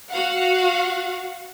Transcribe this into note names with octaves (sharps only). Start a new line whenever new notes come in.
F#4 F5 F#5